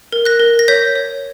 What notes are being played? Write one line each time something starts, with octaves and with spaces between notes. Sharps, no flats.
A#4
F#6 A#6
A#4
A#6
C#5 G6 B6
C#5